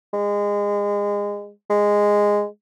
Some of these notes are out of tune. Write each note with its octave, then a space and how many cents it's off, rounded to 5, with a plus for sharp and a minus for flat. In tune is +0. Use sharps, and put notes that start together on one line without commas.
G#3 -25
G#3 -10